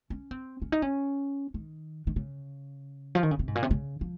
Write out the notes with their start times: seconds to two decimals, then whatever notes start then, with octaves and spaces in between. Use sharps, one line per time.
0.10 C#4
0.31 C4
0.62 C#4
0.72 D#4
0.82 C#4
1.54 D#3
2.07 D#3
2.16 C#3
3.15 F3
3.23 D#3
3.31 C#3
3.39 C3
3.48 G#2
3.55 A#2
3.63 C3
3.71 C#3
4.01 F3